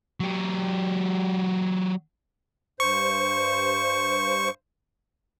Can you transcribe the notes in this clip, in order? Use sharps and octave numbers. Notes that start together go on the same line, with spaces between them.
F#3 G4
G2 C5 C#6